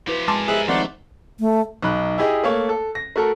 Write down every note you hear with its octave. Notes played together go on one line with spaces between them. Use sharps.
F3 E4 F#4 G4 B4
G#3 A#4 G#5 A5 C6 D6
E4 G4 G#4 C5 D#5 E5 F#6
D#3 F3 A3 C4 D5 F#5 C6
A3
B1 D#4 B5 F#6
E4 G4 G#4 D#5
A3 A#3 C#5
A4
A#6
A3 F#4 A4 A#4